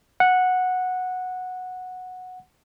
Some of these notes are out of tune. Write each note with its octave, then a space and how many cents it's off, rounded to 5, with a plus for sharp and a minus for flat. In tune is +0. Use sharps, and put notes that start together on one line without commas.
F#5 -10